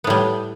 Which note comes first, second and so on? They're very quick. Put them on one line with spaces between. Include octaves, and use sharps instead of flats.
B3 A2 G3